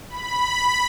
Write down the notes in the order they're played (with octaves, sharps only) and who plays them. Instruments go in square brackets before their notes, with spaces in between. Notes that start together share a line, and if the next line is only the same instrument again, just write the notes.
[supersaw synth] B5